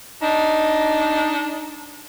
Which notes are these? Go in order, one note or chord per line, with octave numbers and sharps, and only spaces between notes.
D4 D#4